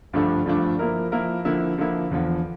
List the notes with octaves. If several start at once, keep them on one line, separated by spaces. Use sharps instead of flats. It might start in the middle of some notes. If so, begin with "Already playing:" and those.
G2 D3 F3 A3 D4
G2 D3 F3 A3 D4
F3 A#3 E4 A#4
F3 A#3 E4 A#4
D3 F3 A#3 E4
D3 F3 A#3 E4
E2 D3 F3